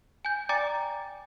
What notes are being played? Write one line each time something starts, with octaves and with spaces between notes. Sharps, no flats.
G#5 G6
D5 G5 G#5 A#5 D6 A6